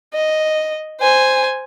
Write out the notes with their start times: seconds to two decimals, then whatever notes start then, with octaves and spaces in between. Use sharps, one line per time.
0.14 D#5
1.01 C5 G#5